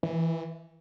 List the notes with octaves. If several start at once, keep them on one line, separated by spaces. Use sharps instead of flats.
E3